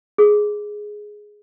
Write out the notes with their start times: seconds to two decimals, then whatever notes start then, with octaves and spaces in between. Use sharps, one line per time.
0.18 G#4